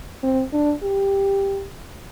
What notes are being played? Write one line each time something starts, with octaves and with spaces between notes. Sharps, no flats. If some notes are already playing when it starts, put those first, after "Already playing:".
C4
D4
G4